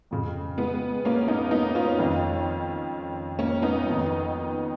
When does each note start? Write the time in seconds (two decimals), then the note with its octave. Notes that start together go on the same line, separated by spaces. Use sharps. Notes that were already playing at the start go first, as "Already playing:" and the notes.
0.11 F2 C#3
0.58 G#3 B3
1.05 A#3 C#4
1.28 B3 D#4
1.51 B3 D#4
1.75 C#4 F4
1.99 F2 D#3
3.39 A#3 C#4
3.62 B3 D#4
3.86 F2 D#3